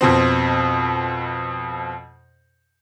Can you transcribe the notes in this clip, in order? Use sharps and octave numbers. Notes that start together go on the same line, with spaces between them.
F2 B2 C4